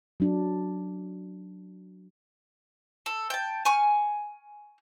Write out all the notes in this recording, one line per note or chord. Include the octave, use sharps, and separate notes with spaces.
F#3 D4
A4
G5 A5
G#5 C#6 F6